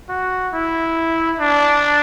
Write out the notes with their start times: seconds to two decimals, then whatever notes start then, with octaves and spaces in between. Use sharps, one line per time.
0.09 F#4
0.53 E4
1.39 D4